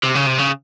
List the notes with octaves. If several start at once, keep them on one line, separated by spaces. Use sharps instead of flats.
C3
C#3
C3
C#3